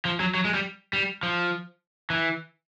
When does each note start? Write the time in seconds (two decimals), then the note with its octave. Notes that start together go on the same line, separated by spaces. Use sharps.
0.05 F3
0.20 F#3
0.35 F#3
0.45 G#3
0.54 G3
0.93 G3
1.23 F3
2.10 E3